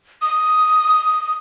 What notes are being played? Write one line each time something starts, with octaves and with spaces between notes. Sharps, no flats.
D#6